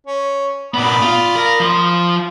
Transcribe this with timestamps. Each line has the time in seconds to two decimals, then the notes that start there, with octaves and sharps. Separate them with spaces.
0.07 C#4
0.74 A#2 B3 D5 B5 D#6
1.02 F4
1.36 A#4
1.60 F3 C6